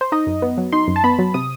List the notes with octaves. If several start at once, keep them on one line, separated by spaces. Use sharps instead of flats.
C5
D#4 D#5
F#2
B3
F#3
D#4 C6
F#2
A5
B3 B5
F#3
C3 D#6